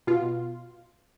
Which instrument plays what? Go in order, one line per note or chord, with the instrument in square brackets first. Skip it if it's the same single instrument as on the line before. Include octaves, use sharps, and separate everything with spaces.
[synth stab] B2 F4